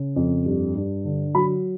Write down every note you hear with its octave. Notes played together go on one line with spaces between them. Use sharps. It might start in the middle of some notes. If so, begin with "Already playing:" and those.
Already playing: C#3
F2
G2
G2
D3
F#3 B5